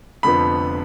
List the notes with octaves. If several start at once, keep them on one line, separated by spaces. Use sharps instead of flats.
F1 F2 D3 F3 B3 B5